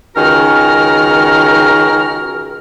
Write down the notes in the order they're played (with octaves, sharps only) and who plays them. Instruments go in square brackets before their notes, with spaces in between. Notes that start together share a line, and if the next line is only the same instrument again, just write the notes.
[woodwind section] C#2 D#3 C#4 F#4 A#4 F6